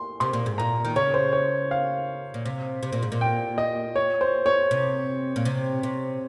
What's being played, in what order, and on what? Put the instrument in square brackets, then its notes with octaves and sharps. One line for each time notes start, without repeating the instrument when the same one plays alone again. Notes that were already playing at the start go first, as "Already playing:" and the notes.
Already playing: [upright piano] C6
[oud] C3 [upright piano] C6
[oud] A#2
G#2
[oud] A#2 [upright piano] A#5
[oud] D#3
[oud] C#3 [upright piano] C#5
[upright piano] C5
C#5
F5
[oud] A#2
C3
C3
A#2
G#2
A#2
[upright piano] G5
D#5
C#5
C5
C#5
[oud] C3
A#2
C3
C3